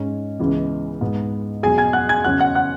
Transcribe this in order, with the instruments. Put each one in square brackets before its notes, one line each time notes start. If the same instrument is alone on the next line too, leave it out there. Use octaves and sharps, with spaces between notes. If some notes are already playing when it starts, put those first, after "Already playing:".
Already playing: [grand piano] G#2 G#3 C#4
C#2 C#3 E3 G#3 B3
G#2 G#3 B3
E2 B2 F#3 G#4 G#5
G#5 G#6
F#5 F#6
G#5 G#6
E2 C#3 F#3 C#4 F#5 F#6
F#5 F#6
F#5 F#6